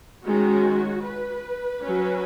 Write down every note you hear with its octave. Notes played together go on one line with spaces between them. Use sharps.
D#3 G#3 C#4 F#4
B4
F#3 C#4